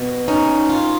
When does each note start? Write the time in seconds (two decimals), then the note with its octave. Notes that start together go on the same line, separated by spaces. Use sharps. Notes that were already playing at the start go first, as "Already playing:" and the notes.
Already playing: B2
0.28 C#4 D#4
0.69 F4